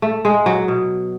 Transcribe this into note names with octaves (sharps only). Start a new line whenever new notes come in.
A3
G#3
F#3
B2